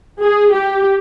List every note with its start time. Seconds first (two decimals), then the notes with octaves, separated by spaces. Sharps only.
0.21 G#4
0.53 G4